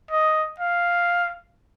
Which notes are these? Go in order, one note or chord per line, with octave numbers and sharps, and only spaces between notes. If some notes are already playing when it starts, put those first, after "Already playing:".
D#5
F5